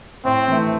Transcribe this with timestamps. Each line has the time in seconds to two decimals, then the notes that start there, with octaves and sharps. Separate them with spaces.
0.25 A2 C4
0.48 E3 A3